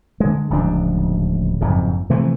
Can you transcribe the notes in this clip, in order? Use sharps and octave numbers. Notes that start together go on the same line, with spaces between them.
D3 G#3
D1 C#2 F3 D4
F#1 F2 G#2
C3 E3 F3 A3